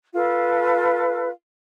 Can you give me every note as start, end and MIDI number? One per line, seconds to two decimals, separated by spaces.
0.13 1.27 65
0.13 1.27 69
0.13 1.27 71